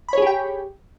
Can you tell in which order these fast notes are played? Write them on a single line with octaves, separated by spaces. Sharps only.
B5 C#5 G#4 G4 G5